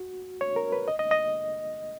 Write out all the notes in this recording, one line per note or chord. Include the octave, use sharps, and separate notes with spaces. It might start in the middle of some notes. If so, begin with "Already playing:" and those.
Already playing: F#4
C#5
A#4
B4
D#5
D#5
D#5